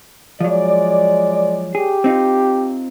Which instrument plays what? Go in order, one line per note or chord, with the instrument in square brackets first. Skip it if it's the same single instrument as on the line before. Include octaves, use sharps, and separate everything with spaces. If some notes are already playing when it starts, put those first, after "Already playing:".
[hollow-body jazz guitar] F3 F#3 [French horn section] G#3 C#5 D5
[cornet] G4 [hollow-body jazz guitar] G#4
[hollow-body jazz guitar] C4 D#4 F4